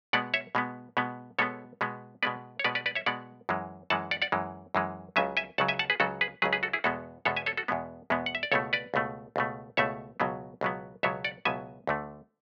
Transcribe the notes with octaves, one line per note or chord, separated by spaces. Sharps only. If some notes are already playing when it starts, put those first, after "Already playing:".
B2 G#3 B3 D5 F#5
C#5 E5
B2 G#3 B3
B2 G#3 B3
B2 G#3 B3 A4 C#5
B2 G#3 B3
B2 G#3 B3 B4 D5
C#5
B2 G#3 B3 B4 D5
B4 D5
B4 D5
C#5 E5
B2 G#3 B3 D5 F#5
F#2 E3 G#3
F#2 E3 G#3 F#5 A5
D5 F#5
D5 F#5
F#2 E3 G#3
F#2 E3 G#3
C#2 C#3 F#3 E5 G#5
E5 G#5
C#2 C#3 F#3 F#5 A5
E5 G#5
F#5 A5
G#4 B4
C#2 C#3 F#3 F#4 A4
G#4 B4
C#2 C#3 F#3 G#4 B4
G#4 B4
F#4 A4
E4 G#4
E2 B2 G#3 B3 F#4 A4
E2 B2 G#3 B3 A4 C#5
E5 G#5
A4 C#5
F#4 A4
E2 B2 G#3 B3
E2 B2 G#3 B3
F#5
E5
D5
C#2 B2 A3 A4 C#5
B4 D5
C#2 B2 A3
C#2 B2 A3
C#2 B2 A3 C#5 E5
C#2 B2 F#3 B3
C#2 B2 F#3 B3
C#2 B2 F#3 B3 C#5 E5
D5 F#5
C#2 B2 F#3 B3 E5 G#5
D2 D3 A3